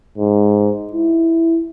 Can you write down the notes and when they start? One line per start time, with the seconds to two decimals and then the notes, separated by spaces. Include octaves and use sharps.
0.18 G#2
0.92 E4